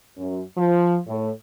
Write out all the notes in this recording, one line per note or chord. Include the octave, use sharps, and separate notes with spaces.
F#2
F3
A2